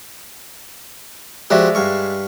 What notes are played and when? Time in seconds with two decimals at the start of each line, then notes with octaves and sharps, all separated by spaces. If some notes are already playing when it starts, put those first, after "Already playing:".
1.50 F3 G#3 F#4 G4 D5 E5
1.75 G2 F5 C#6